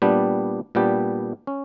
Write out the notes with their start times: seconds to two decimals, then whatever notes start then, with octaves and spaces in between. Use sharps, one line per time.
0.02 A#2 G3 B3 D4 G4
0.75 A#2 G3 B3 D4 G4
1.47 C#4